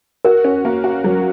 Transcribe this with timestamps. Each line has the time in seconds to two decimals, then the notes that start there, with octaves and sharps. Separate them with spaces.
0.25 F#4 A#4
0.44 C#4
0.65 A#3
0.84 F#4
1.04 F#3